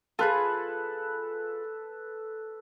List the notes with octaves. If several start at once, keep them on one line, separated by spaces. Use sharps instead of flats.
F4 G#4 A4 B4